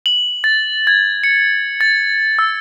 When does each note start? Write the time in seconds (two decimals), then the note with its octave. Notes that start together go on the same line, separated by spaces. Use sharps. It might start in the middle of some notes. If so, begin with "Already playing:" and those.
0.06 F#7
0.44 A6
0.87 G#6
1.24 C#7
1.81 A6
2.39 E6